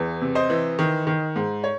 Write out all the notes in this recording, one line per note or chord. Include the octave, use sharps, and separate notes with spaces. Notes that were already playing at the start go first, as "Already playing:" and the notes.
Already playing: E2 E3
C3
C5 D#5
E3
D#3
D#3
G#2
C#5